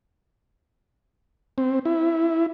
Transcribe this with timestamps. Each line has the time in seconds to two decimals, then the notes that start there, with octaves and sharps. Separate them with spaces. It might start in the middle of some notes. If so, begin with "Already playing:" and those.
1.58 C4
1.85 E4